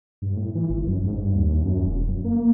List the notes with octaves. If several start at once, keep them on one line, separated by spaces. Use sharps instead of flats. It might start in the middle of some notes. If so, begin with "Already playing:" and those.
G2
A2
E3
G1
F#2
G#2
G2
D#2
F#2
E1
F#2
A#3